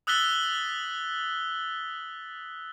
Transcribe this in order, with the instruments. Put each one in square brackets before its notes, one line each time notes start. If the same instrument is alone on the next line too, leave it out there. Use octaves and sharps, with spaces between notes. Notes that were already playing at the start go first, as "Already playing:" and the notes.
[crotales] D#6 E6 F#6 A6 B6 G7